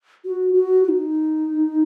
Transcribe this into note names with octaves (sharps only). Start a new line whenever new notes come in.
F#4
F#4
F#4
D#4